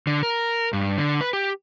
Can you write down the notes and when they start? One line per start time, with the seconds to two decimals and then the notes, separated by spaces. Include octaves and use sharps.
0.07 D3
0.23 A#4
0.73 G2
0.98 D3
1.21 B4
1.33 G4